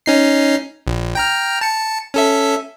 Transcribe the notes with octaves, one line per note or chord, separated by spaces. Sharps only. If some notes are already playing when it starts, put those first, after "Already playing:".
C#4 D#4 C7
A#1
G5 A#5 F6
A5 C#7
C#4 A4 E5